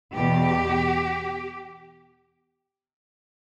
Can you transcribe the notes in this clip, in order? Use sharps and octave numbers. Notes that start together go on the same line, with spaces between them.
E2 B2 G4